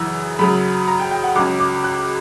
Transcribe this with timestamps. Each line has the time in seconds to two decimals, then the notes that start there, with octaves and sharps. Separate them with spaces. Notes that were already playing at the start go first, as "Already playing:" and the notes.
Already playing: F#2 C#3 E3 E6
0.39 F#2 C#3 F#3 B5
0.88 A#5
1.00 G5
1.11 G5
1.23 F#5
1.35 C#2 C#3 F#3 C#4 D6
1.60 D6
1.84 F#6